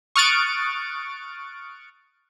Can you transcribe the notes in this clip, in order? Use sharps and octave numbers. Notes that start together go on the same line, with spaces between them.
C#6 D#6 F6 F#6 A6 D7